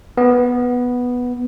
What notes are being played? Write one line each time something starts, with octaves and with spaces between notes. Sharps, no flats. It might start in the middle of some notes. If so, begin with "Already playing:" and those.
B3